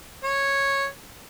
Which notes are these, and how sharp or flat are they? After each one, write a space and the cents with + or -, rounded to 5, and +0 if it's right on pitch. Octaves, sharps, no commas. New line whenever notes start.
C#5 -5